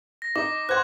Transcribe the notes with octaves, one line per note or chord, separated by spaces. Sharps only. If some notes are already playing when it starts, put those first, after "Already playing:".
A#6
D#4 D6
C5 F#5 C6 F#6 G#6